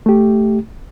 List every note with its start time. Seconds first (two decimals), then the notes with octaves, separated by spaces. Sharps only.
0.06 A3 G4